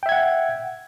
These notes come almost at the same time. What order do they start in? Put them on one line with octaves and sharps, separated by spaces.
G5 E5 G#6 F#5